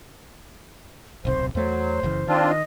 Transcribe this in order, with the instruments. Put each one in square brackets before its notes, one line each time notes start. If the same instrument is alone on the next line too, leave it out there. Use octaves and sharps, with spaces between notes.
[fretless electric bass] D1 B1 C3 [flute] C5
[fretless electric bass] E2 A3 [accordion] F#3 [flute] C5
[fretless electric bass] F#1 C#3 E3
[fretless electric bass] D#3 [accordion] C4 D4 F4
[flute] D#5